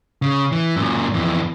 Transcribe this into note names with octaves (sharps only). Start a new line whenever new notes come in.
C#3
E3
F#2 A#2
F2 E3